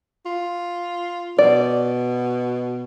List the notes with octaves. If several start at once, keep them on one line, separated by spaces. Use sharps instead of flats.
F4
B2 D5